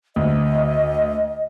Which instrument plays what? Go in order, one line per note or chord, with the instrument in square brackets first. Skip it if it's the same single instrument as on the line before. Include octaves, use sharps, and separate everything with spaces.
[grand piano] D2 [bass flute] D#5